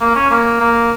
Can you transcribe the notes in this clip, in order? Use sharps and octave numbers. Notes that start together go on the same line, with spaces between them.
A#3
C#4
A#3
A#3